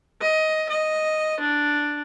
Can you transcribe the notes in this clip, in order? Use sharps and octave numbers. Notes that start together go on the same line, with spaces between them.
D#5
D#5
D4